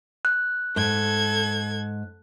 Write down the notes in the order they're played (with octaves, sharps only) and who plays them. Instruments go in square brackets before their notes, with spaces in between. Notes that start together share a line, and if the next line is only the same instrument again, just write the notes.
[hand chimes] F#6
[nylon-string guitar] G#2 [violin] A4 G#6